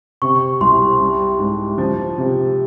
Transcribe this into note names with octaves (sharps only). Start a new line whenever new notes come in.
C3 C#6
C2 C6
G3
G#2
F3
C3